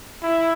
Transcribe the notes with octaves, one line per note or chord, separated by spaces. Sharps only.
E4